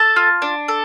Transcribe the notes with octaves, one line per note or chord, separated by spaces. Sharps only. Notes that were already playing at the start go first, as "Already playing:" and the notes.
Already playing: A4 A5
F4
D4
A4